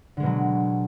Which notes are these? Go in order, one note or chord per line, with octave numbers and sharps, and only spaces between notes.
B2 D3 F#3 G#3